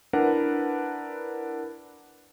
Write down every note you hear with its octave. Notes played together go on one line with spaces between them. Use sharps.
D4 E4 A#4 B4 F#5